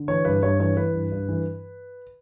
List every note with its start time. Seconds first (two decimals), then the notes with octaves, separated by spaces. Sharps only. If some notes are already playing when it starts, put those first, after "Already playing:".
Already playing: D3
0.08 E3 C#5
0.25 G2 B4
0.43 G2 C#5
0.59 E3 C#5
0.76 E3 B4
0.94 G2
1.12 G2
1.28 E3